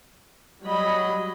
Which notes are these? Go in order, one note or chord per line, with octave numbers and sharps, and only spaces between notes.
F#3 G3 D#5 B5